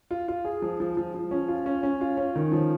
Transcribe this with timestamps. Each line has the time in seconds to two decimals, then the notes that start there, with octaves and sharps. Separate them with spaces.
0.11 F4
0.28 F4
0.45 G#4
0.62 F3
0.80 F3
0.97 F3
1.14 F3
1.31 C#4
1.48 F4
1.66 C#4
1.83 C#4
2.01 F4
2.17 C#4
2.36 D#3
2.52 F3